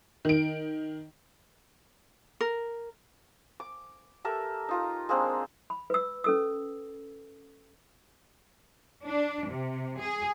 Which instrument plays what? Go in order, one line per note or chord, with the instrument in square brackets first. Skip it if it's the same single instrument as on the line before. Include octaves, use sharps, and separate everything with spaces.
[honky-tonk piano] D#3 D7
[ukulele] A#4
[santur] D6
G4 A4 A#4 E5
D#4 F4 A#5
G#3 A#3 C4 D4
[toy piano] B5
B4 E6
C#4 A4 E6
[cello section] D4
C3
G#4